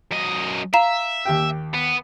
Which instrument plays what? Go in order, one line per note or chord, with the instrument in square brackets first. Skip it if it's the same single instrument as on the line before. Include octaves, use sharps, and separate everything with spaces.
[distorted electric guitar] F#2 D#5
[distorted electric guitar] E5 [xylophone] F5 A#5 E7
[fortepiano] D#2 G4 G5
[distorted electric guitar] B3